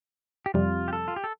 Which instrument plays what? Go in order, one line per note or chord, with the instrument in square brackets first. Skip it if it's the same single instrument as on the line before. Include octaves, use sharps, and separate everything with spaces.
[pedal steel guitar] G4
[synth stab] F2 C3 G3 [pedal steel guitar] F4
[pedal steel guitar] G4
A4
F4
G4
A4